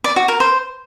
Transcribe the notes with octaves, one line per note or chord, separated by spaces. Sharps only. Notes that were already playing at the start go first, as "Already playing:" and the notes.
D5
F#4
A#4
C5